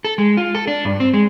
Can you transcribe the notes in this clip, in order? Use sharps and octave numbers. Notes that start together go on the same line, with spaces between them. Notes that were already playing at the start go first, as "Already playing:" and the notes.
A4
G#3
F4
A4
D4
G2
C4
G#3